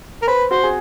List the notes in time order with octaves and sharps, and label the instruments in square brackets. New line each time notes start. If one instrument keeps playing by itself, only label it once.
[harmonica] A#4
[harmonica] B4 [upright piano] C5
[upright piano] F#4 [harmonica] C5
[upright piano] G#4